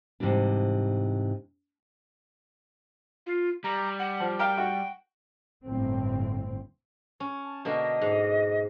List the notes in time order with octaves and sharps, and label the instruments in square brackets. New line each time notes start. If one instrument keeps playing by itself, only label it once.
[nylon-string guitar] G#2 C3 E3 G3 D4
[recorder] F4
[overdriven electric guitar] G3 [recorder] A#5
[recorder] F#5
[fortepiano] F3
[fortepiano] A#4 F5 [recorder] G5
[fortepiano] F#4
[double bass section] G1 A2 C4
[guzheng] C#4
[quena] A5
[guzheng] B2 D3 A#3 [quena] D#5
[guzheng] G#2